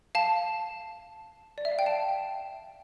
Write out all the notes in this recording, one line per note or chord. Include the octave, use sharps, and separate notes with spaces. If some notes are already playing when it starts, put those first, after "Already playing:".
F5 A5
D5
E5
F5
G5
F5 A5